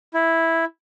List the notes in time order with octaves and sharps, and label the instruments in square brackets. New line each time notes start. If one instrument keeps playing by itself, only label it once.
[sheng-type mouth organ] E4